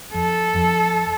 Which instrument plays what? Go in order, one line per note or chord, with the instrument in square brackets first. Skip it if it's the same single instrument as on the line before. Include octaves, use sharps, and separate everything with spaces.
[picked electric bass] F2 [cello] A4
[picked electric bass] F2